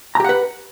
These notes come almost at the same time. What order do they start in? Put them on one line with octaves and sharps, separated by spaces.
A#5 G4 F#5 B4